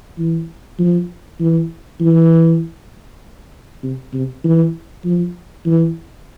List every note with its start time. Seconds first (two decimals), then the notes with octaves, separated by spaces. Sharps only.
0.19 E3
0.79 F3
1.40 E3
2.01 E3
3.83 C3
4.14 C3
4.44 E3
5.05 F3
5.66 E3